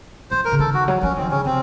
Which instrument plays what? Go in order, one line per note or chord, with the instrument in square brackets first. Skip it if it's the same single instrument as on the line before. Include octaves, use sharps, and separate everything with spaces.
[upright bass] F3 [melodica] C5
[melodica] A#4
[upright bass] C#3
[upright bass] D#3 [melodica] A4
[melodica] F#4
[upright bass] F#3
[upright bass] F3 [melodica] C#4
[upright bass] D#3 [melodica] C4
[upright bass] C#3 [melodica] C#4
[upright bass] C3 [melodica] C4